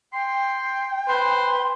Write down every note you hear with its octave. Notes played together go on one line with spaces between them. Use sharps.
G5 C6
B4 C5 C6